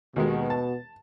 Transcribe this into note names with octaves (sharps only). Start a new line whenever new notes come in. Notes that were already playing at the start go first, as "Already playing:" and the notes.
D#2 B2 D#3 G#3
A5